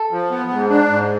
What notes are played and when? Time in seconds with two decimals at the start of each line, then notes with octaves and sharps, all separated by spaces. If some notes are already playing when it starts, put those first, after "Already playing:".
Already playing: A4
0.11 F3
0.31 B3
0.51 G#2
0.70 D4
0.89 G#2